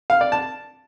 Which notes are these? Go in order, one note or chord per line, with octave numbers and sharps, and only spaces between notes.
F5
D5
A5